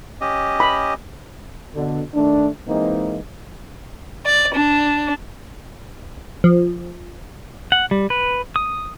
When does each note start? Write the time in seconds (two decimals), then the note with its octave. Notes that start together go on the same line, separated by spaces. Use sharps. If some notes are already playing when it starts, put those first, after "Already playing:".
0.21 C#4 G4 D#5
0.60 B5
1.75 B2 D3
2.14 D#3 A3 D4
2.67 E3 G#3 A#3 C4 D#4
4.25 D5
4.55 D4
6.44 F3
7.72 F#5
7.91 G3
8.10 B4
8.56 D#6